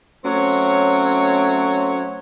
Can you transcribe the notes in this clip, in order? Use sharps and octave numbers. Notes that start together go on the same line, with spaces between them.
F#3 A3 C4 C#4 C#5